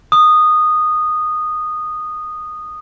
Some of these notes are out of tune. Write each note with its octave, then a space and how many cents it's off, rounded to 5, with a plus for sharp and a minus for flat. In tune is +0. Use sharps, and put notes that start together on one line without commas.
D#6 -10